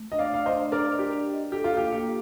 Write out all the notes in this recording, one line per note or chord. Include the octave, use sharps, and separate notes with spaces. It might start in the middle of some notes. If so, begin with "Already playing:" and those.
Already playing: A3
D4 D#5
D5 F5
A3 F5
C5 D#5
D4
D4 A#4 D5
D4
G4
D4
D#5
G4 A4
F4
A#3 G4
A#3 G4